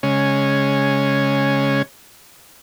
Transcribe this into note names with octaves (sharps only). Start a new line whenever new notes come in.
C#3 G#3 C#4